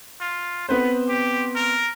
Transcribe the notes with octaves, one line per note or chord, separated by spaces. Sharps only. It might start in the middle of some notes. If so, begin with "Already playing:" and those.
F4
B3 C4 B4 C5
G4
A#4